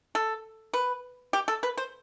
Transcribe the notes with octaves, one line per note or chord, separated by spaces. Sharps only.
A4
B4
G4
A4
B4
C5